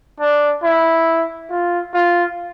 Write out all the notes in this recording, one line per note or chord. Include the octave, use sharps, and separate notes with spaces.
D4
E4
F4
F4